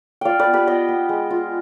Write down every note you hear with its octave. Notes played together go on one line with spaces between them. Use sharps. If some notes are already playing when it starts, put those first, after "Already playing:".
F4 D5 F5 G5
B4 D5
B3
G4 B4
B3 D#5 G5
B3
G#3
F4